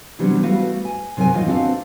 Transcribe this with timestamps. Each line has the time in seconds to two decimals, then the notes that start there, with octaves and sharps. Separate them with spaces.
0.19 C3 E3 F#3 G3 B3 D4
0.43 G3 A3 F#4 B4 E5 F5
0.85 G#5
1.17 C3 F#3 A#4 C5 G#5
1.33 E2 A#2 D#3 C#4 F4 D#5
1.47 C4 D4 F#4 A4 B4 F5